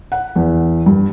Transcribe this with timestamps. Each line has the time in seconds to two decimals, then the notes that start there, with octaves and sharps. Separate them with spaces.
0.12 F#5
0.36 E2
0.86 G2